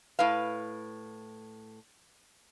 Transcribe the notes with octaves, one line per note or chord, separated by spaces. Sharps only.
A2 B4 F5